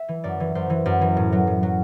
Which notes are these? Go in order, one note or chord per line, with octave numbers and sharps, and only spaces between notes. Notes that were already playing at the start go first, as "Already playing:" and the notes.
Already playing: E5
E3
F#2 D5
E3
F#2 C5
E3
F#2
E3
A2
F#3
A2
F#3